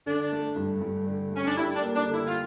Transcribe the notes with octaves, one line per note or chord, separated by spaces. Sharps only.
D3 D4
A3
G2
G2
D3
A3 C#4
D4
G3 E4
D4
A#3
D4
D3
E4
F4